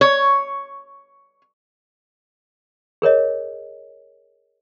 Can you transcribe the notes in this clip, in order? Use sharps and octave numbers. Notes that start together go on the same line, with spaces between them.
C#5
G#4 A#4 C#5 D#5